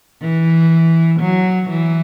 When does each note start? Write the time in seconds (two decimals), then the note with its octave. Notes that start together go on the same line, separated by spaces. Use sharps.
0.21 E3
1.20 F#3
1.69 E3